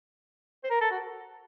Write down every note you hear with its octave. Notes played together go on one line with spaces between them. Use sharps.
C5
A#4
A4
F#4